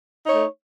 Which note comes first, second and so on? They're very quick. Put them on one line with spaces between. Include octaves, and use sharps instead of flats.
D#4 C#5 A3